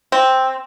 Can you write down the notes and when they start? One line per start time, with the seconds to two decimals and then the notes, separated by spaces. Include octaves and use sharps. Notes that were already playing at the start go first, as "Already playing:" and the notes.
0.12 C4